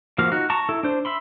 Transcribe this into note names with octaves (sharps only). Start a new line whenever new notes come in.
F3 A#3 F#4 F5
D#4 F#4
A5 A#5 C#6
E4 A4
D4 C5
E5 B5 C6